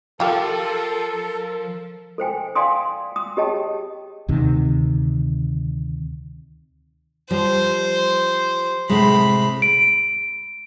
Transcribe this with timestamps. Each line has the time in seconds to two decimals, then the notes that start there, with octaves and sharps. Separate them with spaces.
0.20 F3 F4 G4 A4 A#4
2.18 A4 C5 G5 G#5
2.55 D5 F5 G5 G#5 C6 D#6
3.12 G5 D#6
3.37 G4 G#4 C#5 D#5 G5 A5
4.28 D2 C3 D#3
7.31 F3 G3 C5
8.90 A2 C3 G#3 B5
9.62 D7